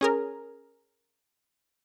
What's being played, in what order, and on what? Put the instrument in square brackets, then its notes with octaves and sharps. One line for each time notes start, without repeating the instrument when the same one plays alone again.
[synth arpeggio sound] C#4 G#4 A#4